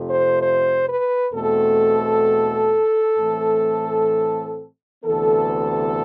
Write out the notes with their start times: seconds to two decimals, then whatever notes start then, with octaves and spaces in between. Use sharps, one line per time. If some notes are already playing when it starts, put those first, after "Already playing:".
Already playing: F2 C3 F3 A3 C4
0.10 C5
0.41 C5
0.87 B4
1.33 E2 B2 A3 C4 A4
3.18 A2 E3 A3 C4
5.04 D2 C3 E3 B3 A4